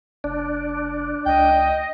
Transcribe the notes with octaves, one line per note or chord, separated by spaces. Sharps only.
F1 D4
C#2 D#5 G5